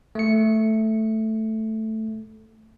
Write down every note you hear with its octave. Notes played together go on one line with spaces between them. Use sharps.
A3 C#7